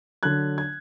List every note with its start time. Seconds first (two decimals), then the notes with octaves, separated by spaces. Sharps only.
0.23 D3 F#3 F#6 G#6
0.58 G#6